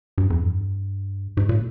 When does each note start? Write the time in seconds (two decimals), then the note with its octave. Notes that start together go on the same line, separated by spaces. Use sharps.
0.18 G2
0.30 F2
0.43 G2
1.37 G#2
1.49 A#2